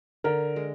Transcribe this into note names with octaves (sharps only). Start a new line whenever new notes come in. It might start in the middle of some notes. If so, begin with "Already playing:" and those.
D3 A#4
G#3